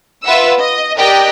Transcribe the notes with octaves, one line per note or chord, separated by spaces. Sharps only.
F4 B4 E5 F#5 E6
D#5
G4 A#4 D5 D#5 G5 F#6